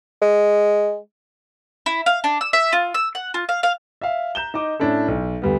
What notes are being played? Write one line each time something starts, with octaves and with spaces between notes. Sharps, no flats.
G#3
E4
F5
D4
E6
E5
F4
E6
F#5
F4
F5
F5
E5 F5
A#5 G6 E7 G7
D#4 D#5 D6
A2 C#4 D4 E4 A4
B1
D2 G3 B3